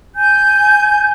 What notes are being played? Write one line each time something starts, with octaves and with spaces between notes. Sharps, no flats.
G#5 G6